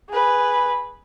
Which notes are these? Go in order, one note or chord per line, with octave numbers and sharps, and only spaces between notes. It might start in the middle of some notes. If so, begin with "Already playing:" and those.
G#4 B4